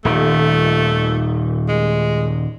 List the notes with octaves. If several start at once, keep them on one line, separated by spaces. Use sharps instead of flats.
D#1 D#3 A3
G#3